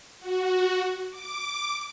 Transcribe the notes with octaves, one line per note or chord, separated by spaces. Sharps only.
F#4
D6